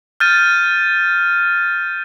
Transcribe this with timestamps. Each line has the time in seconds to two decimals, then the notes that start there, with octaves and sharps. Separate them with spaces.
0.20 F6 G6 A6 D#7